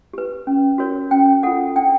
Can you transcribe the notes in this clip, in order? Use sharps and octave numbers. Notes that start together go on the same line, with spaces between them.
G4 B4
C#4
F#4 A#4 C#5
C#4 G5
F4 A4 F#5
D4 G5